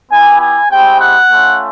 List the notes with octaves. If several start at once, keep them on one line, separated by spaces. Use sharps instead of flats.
B3 E4 G4 G#5
G#5
G#3 C4 E4 G4 G5
F#5
A3 C#4 F4